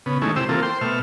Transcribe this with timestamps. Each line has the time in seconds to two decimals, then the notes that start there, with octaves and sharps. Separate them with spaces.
0.06 C#3 B3
0.22 D#3 G#3 A3 C#4 E4
0.36 C3 E4 G4 C5 E6
0.49 E3 A#3 C4 F4 A4
0.63 C5 G5 C6
0.81 B2 A3 E5 F6